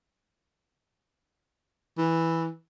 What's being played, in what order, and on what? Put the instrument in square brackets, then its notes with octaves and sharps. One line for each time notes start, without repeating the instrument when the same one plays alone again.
[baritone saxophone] E3